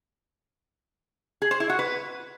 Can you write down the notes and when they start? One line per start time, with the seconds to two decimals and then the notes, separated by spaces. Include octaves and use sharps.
1.42 G#4
1.51 C5
1.60 E4
1.69 F#4
1.79 B4